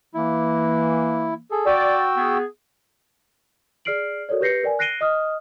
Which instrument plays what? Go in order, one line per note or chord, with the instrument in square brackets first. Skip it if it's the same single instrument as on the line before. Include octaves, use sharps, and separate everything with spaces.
[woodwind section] E3 A#3 [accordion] E4
[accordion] G#4 A4
[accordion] F#4 G5 E6 [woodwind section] D5
[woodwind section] B3 G#4
[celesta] G#4 D5 F6 C7 D7 F#7
F#4 A4 A#4 C#5 D5
G4 B4 G6 A#6 C7 C#7
A#4 D5 G5 G#5
F#6 A#6 C7 D7 D#7 G7
D#5 D#6 F6